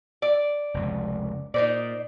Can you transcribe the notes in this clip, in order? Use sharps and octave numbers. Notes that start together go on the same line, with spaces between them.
D5
F1 C#2
A#2 D#4 C5 D5